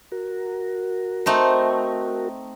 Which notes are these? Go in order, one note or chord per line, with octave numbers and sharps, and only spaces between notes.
F#4 A#4
A3 C4 D#4